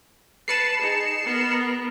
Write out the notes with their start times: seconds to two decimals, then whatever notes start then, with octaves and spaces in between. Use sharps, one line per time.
0.48 B4 A5 C7 C#7 E7
0.81 D#4 G#4
1.24 B3 A#4